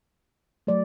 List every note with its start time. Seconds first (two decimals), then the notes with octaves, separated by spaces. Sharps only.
0.67 F#3 A3 D5